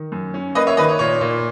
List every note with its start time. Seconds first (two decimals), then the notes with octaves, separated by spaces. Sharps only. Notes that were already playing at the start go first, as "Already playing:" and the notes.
Already playing: D#3
0.12 F#2
0.34 C#4
0.55 A#3 B4 D#5
0.67 C#5 E5
0.77 D#3 B4 D#5
0.89 C#5
0.99 A#2 C#5
1.21 A#2